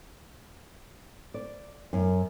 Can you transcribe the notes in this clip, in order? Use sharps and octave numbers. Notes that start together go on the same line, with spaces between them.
D5
F#2